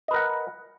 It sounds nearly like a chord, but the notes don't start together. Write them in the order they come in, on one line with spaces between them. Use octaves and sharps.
D#5 B4 A#4 F#5